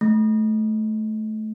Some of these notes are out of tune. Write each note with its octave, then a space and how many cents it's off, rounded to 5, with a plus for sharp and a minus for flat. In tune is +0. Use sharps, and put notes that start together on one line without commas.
A3 -20